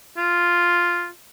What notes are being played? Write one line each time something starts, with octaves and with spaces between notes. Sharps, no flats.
F4